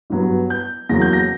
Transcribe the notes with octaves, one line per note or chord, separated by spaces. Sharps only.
G2 F#3 B3
G6
E2 C#3 F#3 A#3 A#6
G6
A#6